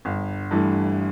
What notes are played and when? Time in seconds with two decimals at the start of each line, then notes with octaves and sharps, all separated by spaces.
0.05 G1
0.51 G2 E3 A3